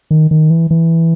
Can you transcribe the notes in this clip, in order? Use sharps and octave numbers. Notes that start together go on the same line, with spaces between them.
D#3
D#3
E3
E3